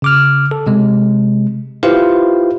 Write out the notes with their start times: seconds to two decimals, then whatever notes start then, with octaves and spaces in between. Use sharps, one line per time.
0.02 C#3 D6 F6
0.51 A4
0.67 C3 G#3
1.83 E4 F4 G4 B4 C5 F5